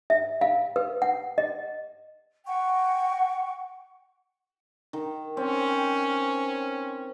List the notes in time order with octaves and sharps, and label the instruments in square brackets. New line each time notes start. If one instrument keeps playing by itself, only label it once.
[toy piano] E5
F5
B4
F#5
D#5
[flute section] F#5 G5 C#6
[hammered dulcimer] D#3
[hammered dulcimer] C4 [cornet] C#4